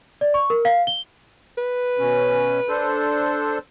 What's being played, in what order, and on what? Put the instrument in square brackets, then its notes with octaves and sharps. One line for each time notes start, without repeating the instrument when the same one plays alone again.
[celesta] D5
C#6
A#4
F5
G7
[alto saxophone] B4
[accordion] B2 C#4
D4 A4 C5